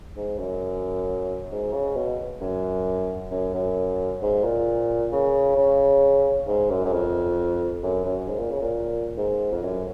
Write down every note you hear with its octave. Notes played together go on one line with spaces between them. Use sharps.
G#2
F#2
G#2
C#3
B2
F#2
F#2
F#2
G#2
A#2
C#3
C#3
G#2
F#2
F#2
F2
F#2
F#2
G#2
A#2
C#3
A#2
G#2
F2
F#2